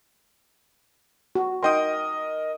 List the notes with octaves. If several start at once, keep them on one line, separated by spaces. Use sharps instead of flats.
F#4
D#4 A#4 D#5 G5 C6 D#6